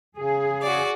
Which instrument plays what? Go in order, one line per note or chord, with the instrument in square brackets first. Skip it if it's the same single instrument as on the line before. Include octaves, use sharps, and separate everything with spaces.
[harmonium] C#3 [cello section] G#4
[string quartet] F#4 D5